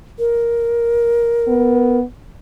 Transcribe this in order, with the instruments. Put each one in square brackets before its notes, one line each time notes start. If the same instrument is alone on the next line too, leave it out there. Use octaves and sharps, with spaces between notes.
[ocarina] A#4
[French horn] B3